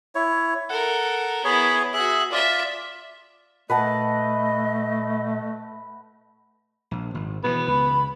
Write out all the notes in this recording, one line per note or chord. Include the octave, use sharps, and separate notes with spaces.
E4 C#5
A4 A#4 F#5
B3 E4 G#4 C#5
F#4 G#4 E5 F#6
F4 D5 E5
A#2 A3 B4 D#5 F#5 A5
A#1
G#1
B2 D3 E3 B3
C#2 B5